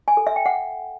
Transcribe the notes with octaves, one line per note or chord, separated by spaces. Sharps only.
G#5
A4
E5
G5
F#5